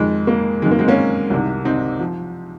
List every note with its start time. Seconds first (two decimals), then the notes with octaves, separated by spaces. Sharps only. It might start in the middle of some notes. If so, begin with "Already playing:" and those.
Already playing: F2 D#3 G#3
0.27 A#3
0.62 F#2 D#3 G#3
0.71 A#3
0.79 G#3 C4
0.88 A#3 C#4
1.30 C2 C3 D#3
1.65 C4 D#4
1.99 F3